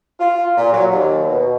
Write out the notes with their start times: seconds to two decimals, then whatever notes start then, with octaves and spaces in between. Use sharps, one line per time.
0.19 F4
0.58 A#2
0.73 F#3
0.91 D#2
1.29 B2